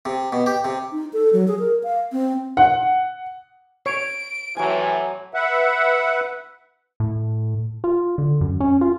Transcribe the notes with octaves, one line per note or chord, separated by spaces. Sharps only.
C3
B2
G4
C3
D#4
A4
F#3
G#4
A#4
F5
C4
F#5
C#5 D7
A2 C3 E3 F#3 G#5
B4 E5 F#5
A2
F4
D3
F#2
C#4
F4